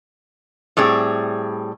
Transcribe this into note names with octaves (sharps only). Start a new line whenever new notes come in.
A2 G3 C4 G#4